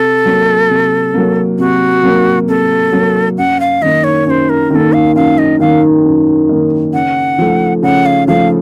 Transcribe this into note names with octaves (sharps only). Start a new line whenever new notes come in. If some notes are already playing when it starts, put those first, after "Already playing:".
Already playing: C3 A4
F#3 A#3
C3
F#3 A#3
C3 F#4
F#3 A#3
C3 A4
F#3 A#3
F#2 F#5
F5
D#3 A#3 D#5
C#5
F#2 C5 C#5
A#4
D#3 A#3 A4 A#4
F5
F#2 F5
D#5
D#3 A#3 F5
F#2
D#3 A#3
C#3 F#5
F3 A3
C#3 F#5
F5
F3 A3 F5